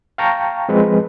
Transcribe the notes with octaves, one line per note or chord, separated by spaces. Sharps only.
F5 G5 A5 A#5 C#6
F3 G#3 C4 B4